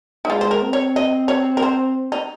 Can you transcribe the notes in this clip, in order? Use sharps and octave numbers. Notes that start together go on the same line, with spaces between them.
D#4
G#3 F4
C5
A#4
C4
C#5
D#5
C#5
A#4
C5
D#4